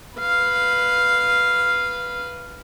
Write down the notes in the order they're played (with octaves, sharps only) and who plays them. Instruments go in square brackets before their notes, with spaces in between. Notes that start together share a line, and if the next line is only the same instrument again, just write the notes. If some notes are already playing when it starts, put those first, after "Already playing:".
[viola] B4 F5